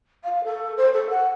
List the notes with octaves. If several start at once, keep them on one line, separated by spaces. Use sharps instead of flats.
F5
A4
C5
A4
F#5